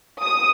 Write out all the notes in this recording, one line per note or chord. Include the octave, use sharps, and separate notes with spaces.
D#6